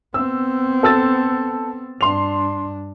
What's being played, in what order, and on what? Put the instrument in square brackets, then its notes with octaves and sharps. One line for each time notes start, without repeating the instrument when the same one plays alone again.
[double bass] B3 C4 [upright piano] E6
[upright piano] A4 E6 A6
[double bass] G2 D4 [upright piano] C6 F7